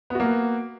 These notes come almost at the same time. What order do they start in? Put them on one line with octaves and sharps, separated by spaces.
B3 F#4 A#3